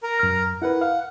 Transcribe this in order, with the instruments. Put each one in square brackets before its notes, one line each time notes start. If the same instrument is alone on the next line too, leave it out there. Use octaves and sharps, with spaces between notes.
[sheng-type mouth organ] A#4 A#5
[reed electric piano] F#2 F6
[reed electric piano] E4 A#4 B4 [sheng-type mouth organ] F#5
[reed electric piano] F5